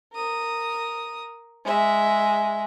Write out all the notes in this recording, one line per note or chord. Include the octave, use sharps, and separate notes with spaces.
A#4 D#6
G#3 E5